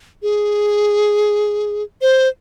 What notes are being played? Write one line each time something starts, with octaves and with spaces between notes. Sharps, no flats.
G#4
C5